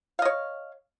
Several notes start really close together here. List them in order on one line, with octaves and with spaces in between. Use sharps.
F5 D#5 C#5